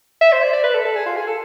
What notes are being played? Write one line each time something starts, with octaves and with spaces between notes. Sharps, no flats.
E5
C5
D5
D5
B4
A4
A4
G#4
F4
G#4
A4